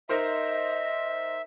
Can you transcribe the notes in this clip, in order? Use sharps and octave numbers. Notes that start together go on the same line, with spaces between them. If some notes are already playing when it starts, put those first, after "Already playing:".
D#4 A#4 C5 D#5 E5